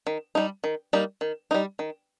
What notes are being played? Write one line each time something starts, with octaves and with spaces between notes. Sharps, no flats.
D#3
G3 A#3 D#4
D#3
G3 A#3 D#4
D#3
G3 A#3 D#4
D#3